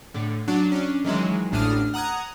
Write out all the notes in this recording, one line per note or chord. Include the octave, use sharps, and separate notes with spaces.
A2 D3
F#3 D4
C#4 D4
D#3 E3 F#3 G#3
A1 D2 A2 D4 D#6 F6
F#5 A#5 D#6 F#6 G#6